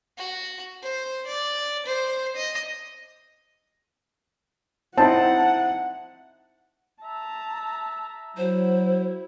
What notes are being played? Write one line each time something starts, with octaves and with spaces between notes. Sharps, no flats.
F#4
C5
D5
C5
D#5
C4 D#4 E4 F#5 A5
E5 A5 A#5
F#3 E4 C5